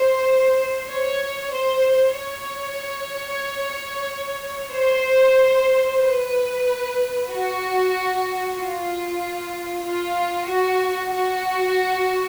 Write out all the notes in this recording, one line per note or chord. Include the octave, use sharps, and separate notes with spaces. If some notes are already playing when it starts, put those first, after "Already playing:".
Already playing: C5
C#5
C5
C#5
C5
B4
F#4
F4
F4
F#4
F#4